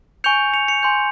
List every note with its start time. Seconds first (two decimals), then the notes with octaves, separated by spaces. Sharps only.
0.24 G#5 C#6 G6 C#7 F7
0.54 C#7 F7
0.68 C#7 F7
0.83 G#5 C6 G6